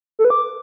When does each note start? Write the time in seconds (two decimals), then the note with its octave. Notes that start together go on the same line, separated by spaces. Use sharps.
0.19 A4
0.25 B4
0.30 D6